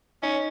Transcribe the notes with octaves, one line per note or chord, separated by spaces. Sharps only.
C#4 D#4